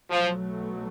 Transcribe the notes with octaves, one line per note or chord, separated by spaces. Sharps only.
B1 B2 F3 F#3 A3